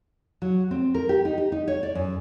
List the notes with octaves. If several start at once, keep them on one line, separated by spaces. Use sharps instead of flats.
F#3
C4
A#4
G4
D#4
G4
D#4
C#5
D5
F#2